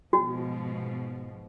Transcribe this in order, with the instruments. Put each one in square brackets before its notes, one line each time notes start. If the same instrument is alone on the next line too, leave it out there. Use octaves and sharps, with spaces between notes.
[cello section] G#2 B2 F3 [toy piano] F#4